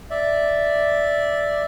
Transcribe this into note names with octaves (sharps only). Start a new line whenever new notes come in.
D5 E5